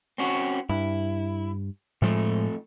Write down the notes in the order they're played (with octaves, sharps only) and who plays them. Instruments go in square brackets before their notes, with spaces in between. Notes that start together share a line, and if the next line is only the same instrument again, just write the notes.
[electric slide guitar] C4 C#4 F#4
[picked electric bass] G2 [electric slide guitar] E4
[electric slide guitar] F2 A3 [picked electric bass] A2 F3 G#3